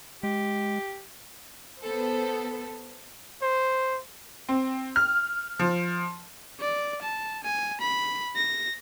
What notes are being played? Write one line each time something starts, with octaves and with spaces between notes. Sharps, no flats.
G#3 G4
B3 A4 C5
C5
C4
F6
F3
D5
A5
G#5
B5
A#6